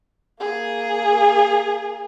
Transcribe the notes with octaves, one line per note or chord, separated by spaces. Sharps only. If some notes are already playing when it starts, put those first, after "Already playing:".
A#3 G#4